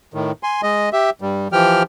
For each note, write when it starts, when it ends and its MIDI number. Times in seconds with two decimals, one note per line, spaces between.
0.14 0.32 45
0.14 0.32 51
0.43 0.61 80
0.43 0.61 84
0.63 0.89 56
0.63 0.89 75
0.93 1.10 67
0.93 1.10 76
1.21 1.48 43
1.21 1.48 55
1.52 1.83 52
1.52 1.83 53
1.52 1.83 67
1.52 1.83 79
1.52 1.83 89